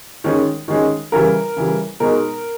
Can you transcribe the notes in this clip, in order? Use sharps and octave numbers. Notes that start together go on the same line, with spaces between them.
D#3 G#3 C#4
D#3 G#3 C#4
C#3 E3 G3 A#4
C#3 E3 G3
B2 G#3 D#4 A#4